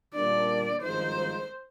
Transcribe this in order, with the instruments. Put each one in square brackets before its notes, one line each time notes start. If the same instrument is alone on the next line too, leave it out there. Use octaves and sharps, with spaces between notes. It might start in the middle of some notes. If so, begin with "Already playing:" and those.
[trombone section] A#2 G3 A#3 D4 [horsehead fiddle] D5
[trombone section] G#1 G2 F3 G#3 D#4 [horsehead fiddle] C5